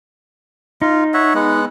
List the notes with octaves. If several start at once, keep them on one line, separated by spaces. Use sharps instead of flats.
D#4 F4
C#5 E5 F#5
G#3 B3 F#5